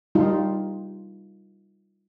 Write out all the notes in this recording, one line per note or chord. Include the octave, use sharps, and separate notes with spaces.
G3 D#4 F4